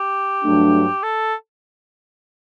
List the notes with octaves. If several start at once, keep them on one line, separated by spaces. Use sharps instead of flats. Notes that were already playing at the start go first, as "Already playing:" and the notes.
Already playing: G4
G2 F#3 A3 D4
A4